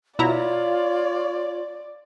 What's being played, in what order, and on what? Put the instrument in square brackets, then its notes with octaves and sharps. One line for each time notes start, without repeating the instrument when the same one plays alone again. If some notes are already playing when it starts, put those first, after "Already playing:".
[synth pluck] B2 E4 A#5 [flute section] F4 C#5 [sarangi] D5